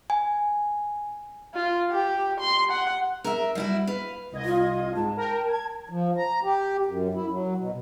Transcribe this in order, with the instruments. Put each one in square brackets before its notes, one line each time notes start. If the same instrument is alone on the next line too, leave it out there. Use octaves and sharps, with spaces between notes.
[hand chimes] G#5
[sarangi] F4
G4
C6
F#5
[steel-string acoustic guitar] A#4 E5
G3 E4 F#4
B4 F5
[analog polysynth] C2 D#5 G#6
[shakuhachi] F4
[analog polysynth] G#2 [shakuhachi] A5
[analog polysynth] A#4 G5
G#6
[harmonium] F3
A#5
G4
F#2
E4
F#3
B2